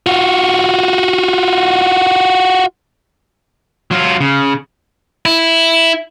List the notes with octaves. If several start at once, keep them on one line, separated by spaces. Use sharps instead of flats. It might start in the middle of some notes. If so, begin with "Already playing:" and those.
F4 F#4
F#3 F4
C#3
E4